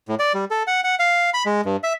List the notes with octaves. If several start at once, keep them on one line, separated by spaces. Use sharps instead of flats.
A2
D5
G3
A4
F#5
F#5
F5
B5
G#3
G2
E5